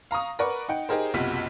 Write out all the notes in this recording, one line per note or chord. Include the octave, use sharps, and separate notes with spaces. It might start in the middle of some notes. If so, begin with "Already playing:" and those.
F5 A#5 C#6 D#6
A#4 B4 D5 F#5 C#6
D#4 F#5 G5
D#4 G4 G#4 A#4 C5
F#1 B1 C3 F4 F#4 B6